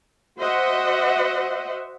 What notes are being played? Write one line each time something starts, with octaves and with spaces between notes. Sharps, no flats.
F#4 C5 D#5 E5 F#5